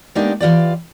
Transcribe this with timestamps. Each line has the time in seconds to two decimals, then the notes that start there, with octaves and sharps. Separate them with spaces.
0.15 G#3 A#3 B3 D4 D#4 G4
0.40 E3 F4 G4 D5